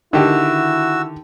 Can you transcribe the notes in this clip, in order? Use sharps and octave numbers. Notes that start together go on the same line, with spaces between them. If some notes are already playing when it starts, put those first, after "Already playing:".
D3 D#3 E4 F#4 G4 E6